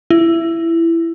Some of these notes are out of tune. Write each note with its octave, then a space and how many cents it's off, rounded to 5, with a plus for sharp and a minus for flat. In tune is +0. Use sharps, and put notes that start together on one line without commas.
E4 +15